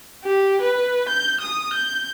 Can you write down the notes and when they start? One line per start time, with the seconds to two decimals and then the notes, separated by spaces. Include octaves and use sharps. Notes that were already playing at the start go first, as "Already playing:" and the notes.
0.24 G4
0.62 B4
1.09 G6
1.41 D#6
1.73 G6